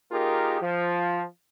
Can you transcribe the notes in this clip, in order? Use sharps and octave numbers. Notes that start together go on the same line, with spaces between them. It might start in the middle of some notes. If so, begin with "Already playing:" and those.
A#3 D#4 F4 G4 G#4 A#4
F3